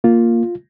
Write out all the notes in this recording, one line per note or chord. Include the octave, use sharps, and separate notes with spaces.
A#3 F4